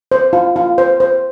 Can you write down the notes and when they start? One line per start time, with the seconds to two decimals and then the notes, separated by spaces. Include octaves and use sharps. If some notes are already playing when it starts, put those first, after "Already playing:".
0.12 C5
0.33 F4
0.56 F4
0.78 C5
1.00 C5